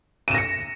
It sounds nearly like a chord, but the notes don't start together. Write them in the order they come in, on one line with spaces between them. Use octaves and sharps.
D#7 E7 A#6 C#7